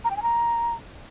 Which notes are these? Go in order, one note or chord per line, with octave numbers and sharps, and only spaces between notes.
A#5
G5
G#5
A#5